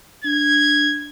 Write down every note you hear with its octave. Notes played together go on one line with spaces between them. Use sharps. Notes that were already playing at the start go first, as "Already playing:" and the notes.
D4 G#6